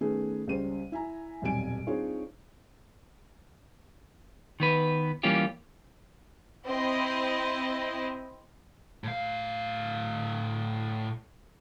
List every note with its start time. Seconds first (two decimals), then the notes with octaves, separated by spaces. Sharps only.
0.01 D#3 A3 B3 C#4 G#4
0.47 C#2 G3 G#3 C#4 C5 D#7
0.92 E4 E5 G#5 A#5
1.42 D#1 B1 F2 G3 G#5 D7
1.87 C4 D4 D#4 F4 G#4 C#5
4.60 D#3 B3 B4
5.23 E3 G3 A#3 C#4 F4 G4
6.66 C4 E4 D#5
9.04 A2 F5